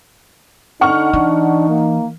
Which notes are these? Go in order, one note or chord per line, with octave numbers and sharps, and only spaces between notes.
D3 D#4 F#5 C#6 F6
E3 D4
A#3